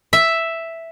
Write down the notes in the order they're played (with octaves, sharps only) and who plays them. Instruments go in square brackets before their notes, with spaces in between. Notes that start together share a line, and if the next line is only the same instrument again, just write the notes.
[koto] E5